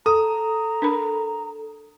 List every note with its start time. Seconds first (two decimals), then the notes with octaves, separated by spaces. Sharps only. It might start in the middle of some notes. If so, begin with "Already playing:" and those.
0.06 A4 A#5 D#6
0.82 D4 A#4 B5